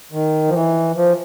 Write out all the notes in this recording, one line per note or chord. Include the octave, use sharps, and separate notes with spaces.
D#3
F3
E3
F3